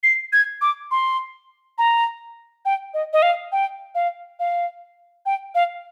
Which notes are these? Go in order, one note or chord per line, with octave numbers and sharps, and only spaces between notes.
C7
G#6
D6
C6
A#5
G5
D#5
D#5
F5
G5
F5
F5
G5
F5